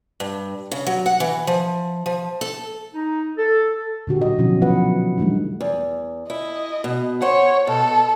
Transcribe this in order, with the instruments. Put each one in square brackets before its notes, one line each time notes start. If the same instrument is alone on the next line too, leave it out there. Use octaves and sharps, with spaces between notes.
[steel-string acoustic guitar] G2
C#3
F#3
F#5
E3
F3
F3
A4
[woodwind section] D#4
A4
[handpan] A#2 D3 F#4 G4
F#3 D#5
B2 D3 F3 C#4 E4 F#4
F3 F#3 F4 F#4 B4 F#5
E3 G3 A3 D4 D#4
[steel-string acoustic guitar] E2
[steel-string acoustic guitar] E4 [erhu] D#5
[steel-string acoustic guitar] B2
[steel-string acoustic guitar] C5 F#5 [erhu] C#5
[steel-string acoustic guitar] B2 [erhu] A4